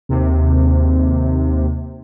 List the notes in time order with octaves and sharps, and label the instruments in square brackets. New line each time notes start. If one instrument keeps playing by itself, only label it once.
[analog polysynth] D#2 C3